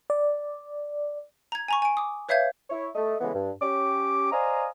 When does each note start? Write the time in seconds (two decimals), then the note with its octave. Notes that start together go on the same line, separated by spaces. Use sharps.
0.10 D5
1.52 A#5 G#6
1.68 G#5 A#5 C#6
1.82 G#5 D7
1.97 D6 D#6
2.29 B4 C#5 E5 F5 G6 G#6
2.70 E4 C#5
2.95 A3 D#5
3.21 C#3 E3 G#3 A3 B3
3.33 G2
3.61 C#4 G4 D6
4.31 C5 D5 D#5 F5 G#5 A#5